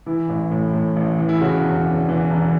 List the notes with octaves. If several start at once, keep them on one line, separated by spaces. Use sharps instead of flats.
E3 E4
A1
A2
A2
A1
E3
E4
C#3 F#4
E1
E2
E3
E1